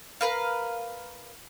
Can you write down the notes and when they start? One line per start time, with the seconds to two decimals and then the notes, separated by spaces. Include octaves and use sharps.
0.21 A#4 B4 F5